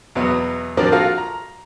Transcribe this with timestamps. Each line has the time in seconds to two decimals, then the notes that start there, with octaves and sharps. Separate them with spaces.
0.15 E2 B2 F#3 B3
0.77 F3 A#3 C4 D4 F#4 A#4
0.92 F4 F#4 A4 A#4 F5
1.18 A#5